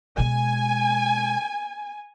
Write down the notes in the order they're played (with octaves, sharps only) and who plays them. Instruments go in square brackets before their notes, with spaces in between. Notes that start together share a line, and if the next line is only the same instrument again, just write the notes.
[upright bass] B2 G#3 [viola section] G#5